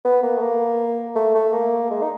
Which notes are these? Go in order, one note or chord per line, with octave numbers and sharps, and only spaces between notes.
B3
A#3
A3
A#3
A3
A3
A#3
G#3
D#4